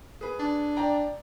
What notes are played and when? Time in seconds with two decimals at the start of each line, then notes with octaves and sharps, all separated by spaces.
0.21 G#4 B4
0.40 D4
0.76 D5 G5 A#5